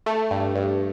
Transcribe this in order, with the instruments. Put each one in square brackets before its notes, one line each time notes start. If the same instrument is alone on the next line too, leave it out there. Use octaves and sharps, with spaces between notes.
[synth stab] A3
G2
G2